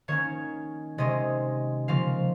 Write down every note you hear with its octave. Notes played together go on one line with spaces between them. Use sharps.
D#3 A#3 C#4 C#5
C3 D#3 G#3 C#4 D#5
C#3 F3 A#3 F5